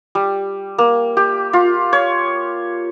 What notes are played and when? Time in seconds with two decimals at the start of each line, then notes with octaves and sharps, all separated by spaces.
0.15 G3
0.78 A#3
1.17 G4
1.53 F4
1.93 C#5